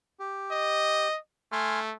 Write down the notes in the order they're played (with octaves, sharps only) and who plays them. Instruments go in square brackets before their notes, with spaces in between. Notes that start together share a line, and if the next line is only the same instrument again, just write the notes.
[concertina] G4
[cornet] D#5
[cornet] A3 [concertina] G#5 C6 F6